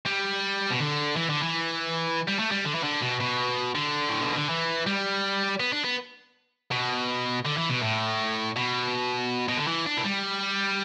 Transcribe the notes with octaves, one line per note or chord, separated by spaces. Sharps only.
G3
B2
D3
E3
D3
E3
G3
A3
G3
D3
E3
D3
B2
B2
D3
A2
B2
D3
E3
G3
B3
D4
B3
B2
D3
E3
B2
A2
B2
B2
D3
E3
D4
E3
G3